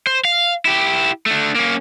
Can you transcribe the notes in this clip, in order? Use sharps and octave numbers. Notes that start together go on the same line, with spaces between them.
C5
F5
E4 G4
A3 D4
A#3 C#4